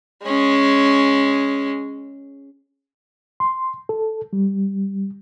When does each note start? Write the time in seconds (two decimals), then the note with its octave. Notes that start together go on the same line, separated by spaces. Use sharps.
0.25 G#3 C#4
3.40 C6
3.89 A4
4.33 G3